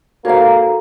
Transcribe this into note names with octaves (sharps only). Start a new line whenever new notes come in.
G#2 A#3 F#4 A4 C#5 F5 A#5